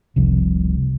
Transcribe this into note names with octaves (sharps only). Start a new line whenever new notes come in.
F1 C2 F2